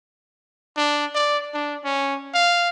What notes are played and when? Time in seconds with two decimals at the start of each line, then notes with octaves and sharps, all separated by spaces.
0.77 D4
1.14 D5
1.54 D4
1.84 C#4
2.34 F5